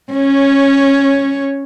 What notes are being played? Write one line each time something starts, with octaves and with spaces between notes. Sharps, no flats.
C#4 C#5